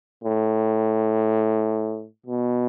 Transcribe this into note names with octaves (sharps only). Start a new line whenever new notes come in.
A2
B2